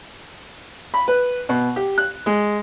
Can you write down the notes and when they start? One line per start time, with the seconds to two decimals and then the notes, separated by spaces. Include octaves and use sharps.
0.94 B5
1.08 B4
1.49 B2
1.76 G4
1.98 F#6
2.26 G#3